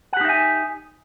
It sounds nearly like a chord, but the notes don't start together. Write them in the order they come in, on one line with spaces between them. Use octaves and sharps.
F#5 G4 D#4 E5 G#5